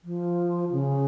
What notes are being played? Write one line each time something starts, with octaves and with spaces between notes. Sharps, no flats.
F3
C#3